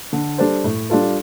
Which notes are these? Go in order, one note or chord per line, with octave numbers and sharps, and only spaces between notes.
D3
G3 D4 A4 C5
A2
G3 D4 F4 A4